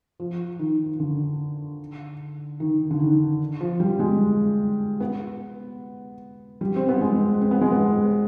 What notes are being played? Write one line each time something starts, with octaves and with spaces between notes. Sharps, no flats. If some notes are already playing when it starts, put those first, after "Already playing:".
F3
D#3
D3
D#3
D3
D#3
F3
G3
G#3
B3
G3
C4
B3
G#3
C4
B3
G#3
B3